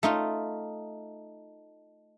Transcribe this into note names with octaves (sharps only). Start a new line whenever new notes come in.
A3 D#4 F4